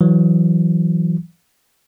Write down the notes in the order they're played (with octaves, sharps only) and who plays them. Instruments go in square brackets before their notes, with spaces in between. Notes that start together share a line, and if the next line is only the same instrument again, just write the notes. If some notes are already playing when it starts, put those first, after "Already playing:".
[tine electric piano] E3 F#3